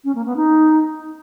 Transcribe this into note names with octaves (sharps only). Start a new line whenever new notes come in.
C#4
A#3
B3
D#4